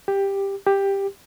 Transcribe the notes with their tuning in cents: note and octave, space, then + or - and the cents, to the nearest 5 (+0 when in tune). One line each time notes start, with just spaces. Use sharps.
G4 +10
G4 +10